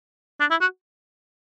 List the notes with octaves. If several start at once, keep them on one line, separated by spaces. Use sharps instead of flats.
D4
E4
F#4